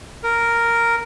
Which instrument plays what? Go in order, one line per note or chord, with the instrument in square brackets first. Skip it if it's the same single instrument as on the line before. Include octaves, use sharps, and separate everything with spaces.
[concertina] A#4